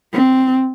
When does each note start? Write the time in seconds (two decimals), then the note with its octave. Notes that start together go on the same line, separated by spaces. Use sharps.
0.13 C4